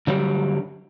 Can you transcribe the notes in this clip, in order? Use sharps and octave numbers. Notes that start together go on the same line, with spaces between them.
D3 F#3 G3